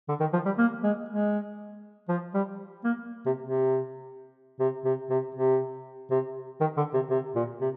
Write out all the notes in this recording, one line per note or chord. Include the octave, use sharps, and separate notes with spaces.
D3
D#3
F3
G3
A#3
G#3
G#3
F3
G3
A#3
C3
C3
C3
C3
C3
C3
C3
D#3
D3
C3
C3
A#2
C3